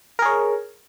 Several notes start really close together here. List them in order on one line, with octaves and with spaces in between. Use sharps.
A#4 G#4 C#5